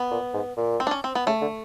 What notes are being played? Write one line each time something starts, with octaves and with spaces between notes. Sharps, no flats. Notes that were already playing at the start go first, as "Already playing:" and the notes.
Already playing: B3
A#2
G#2
A#2
C4
D4
C#4
C4
B3
C#3 A3
D3